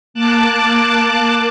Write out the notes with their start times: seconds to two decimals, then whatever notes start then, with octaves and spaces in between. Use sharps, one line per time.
0.14 A#3 A5 D6 F#6